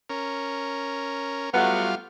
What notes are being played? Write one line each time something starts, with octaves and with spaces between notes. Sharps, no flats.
C#4 A#4
F#3 G3 A3 B3 F4 F5